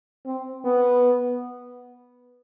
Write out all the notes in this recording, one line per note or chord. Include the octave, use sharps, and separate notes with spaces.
C4
B3